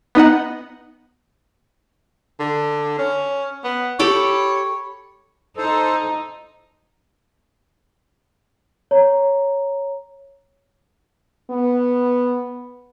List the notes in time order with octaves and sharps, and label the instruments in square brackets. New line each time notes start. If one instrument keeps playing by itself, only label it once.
[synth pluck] B3 D#4 D#5 F#5
[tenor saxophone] D3
C#4
B3
[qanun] G4 A4 B5 [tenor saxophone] C#5
[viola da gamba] D#4 [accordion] A4 C5
[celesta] C#5 A#5
[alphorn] B3